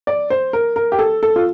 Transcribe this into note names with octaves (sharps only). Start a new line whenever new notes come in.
D5
C5
A#4
A#4
G4
A4
A4
F4